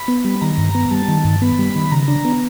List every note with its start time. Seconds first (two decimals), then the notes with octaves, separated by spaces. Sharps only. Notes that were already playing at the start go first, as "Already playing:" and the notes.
Already playing: B5
0.08 B3
0.25 G3
0.41 D#3 A#5
0.58 G2
0.75 B3
0.91 G3 A5
1.08 D#3
1.24 G2
1.42 B3 B5
1.59 G3
1.76 D#3
1.92 C#3 A#5
2.08 D4
2.25 B3